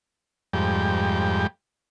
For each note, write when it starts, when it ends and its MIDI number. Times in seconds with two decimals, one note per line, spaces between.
0.53 1.47 41
0.53 1.47 44
0.53 1.47 55
0.53 1.47 79